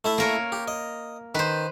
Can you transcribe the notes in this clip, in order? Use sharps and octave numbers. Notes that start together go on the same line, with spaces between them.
A3 E4 E5
A#3 A#4 C#5
G4
D#5
D#3 B4 C5